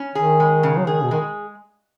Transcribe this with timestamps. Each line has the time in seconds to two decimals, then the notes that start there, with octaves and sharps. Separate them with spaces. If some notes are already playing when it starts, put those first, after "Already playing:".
Already playing: C#4
0.15 D#3 G#4
0.40 G#3
0.63 C#3
0.77 F#3
0.87 D#3 G#4
1.03 B2
1.11 D#3 G#3